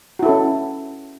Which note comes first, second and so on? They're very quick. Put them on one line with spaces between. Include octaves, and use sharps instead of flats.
F#4 E4 A4 C#4